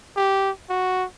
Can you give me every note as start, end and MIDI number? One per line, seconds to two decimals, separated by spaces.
0.16 0.51 67
0.70 1.04 66